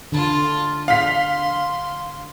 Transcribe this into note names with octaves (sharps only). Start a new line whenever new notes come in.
D3 F4 A5
F5 C6 B6